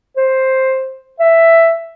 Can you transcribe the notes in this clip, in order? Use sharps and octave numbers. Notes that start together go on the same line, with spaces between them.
C5
E5